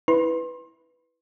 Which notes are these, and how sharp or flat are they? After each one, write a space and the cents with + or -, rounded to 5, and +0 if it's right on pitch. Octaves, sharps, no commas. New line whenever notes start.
E4 -10 B4 +0 C6 +30